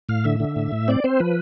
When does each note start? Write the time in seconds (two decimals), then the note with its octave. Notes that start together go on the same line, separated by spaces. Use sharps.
0.09 A2 F5
0.24 D3 E5
0.40 D3
0.56 A2
0.72 A2
0.88 C4 D5
1.04 C4 C5
1.20 F3 B4